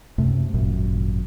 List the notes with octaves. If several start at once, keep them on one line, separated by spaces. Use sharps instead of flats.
F#2 C3 A3
G#1 F#2 A#2